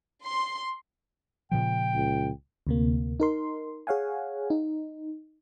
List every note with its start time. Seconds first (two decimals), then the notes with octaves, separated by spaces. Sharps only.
0.24 C6
1.52 A#2 C#3 F3 G5
1.94 C#2
2.67 D2 C3 A#3
3.20 D#4 A#4 C6
3.87 G#4 C#5 F5 F#5 G#5
4.50 D#4